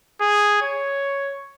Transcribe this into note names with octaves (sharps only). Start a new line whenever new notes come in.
G#4
C#5